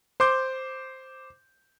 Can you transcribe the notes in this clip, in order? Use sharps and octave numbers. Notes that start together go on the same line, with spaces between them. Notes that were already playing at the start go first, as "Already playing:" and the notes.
C5 C6 D6 G6